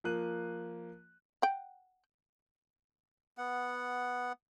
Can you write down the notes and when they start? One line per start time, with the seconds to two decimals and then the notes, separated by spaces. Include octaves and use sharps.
0.04 F3 A#3 F#6 D#7
1.42 F#5 G5
3.38 B3 F#5